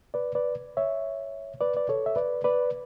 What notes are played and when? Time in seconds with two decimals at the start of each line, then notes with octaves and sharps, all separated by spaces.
0.14 B4 D5
0.35 B4 D5
0.77 C#5 E5
1.61 B4 D5
1.77 D5
1.89 A4 C#5
2.06 E5
2.16 B4 D5
2.44 B4 D5